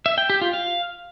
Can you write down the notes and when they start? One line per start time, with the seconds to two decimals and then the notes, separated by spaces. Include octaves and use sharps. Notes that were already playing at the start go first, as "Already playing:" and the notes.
0.06 E5
0.18 G5
0.30 G4
0.42 F4
0.53 F5